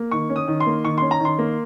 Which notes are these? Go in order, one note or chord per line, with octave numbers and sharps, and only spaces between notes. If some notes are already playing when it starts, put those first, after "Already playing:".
Already playing: A#3
D#3 C#6
C#4
D#6
D#3
C6
A#3
D#3 C#6
C#4 C6
A#5
D#3
C6
A#3